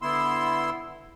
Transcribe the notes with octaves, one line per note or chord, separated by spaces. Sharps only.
D3 B3 E4 C6 E6